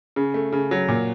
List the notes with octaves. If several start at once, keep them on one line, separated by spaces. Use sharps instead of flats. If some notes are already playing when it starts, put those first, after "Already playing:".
C#3
A3
C#3
F#3
A#2